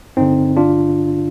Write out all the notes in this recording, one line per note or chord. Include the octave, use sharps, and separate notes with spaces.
G2 D3 C4 D#4
D4 F4